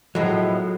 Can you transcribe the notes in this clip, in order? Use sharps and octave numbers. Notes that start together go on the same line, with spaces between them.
A2 F3 F#3 G#3 B3